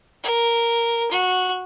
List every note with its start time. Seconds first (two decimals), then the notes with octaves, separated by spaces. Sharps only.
0.24 A#4
1.11 F#4